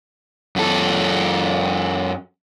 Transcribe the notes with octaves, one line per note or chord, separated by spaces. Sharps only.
F#2 A4